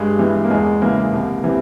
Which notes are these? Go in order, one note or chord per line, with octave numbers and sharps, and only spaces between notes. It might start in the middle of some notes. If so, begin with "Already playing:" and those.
Already playing: G2 G#3
E3 G3
A#3
E2 G#3
C#3 E3 A#3
C2
C3 E3